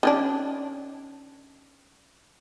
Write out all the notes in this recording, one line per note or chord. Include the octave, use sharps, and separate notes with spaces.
D#3 C#4 D4